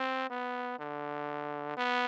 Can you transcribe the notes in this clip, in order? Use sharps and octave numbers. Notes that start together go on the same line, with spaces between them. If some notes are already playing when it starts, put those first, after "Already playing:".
Already playing: C4
B3
D3
B3